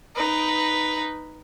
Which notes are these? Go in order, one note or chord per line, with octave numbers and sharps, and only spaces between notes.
D#4 B4